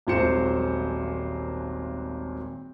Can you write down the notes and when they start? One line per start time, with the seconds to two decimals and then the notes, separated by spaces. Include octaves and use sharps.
0.07 D#1 G#1 F#3 C5 C#7 E7